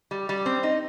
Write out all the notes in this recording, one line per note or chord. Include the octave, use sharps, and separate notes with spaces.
G3
G3
C4
D#4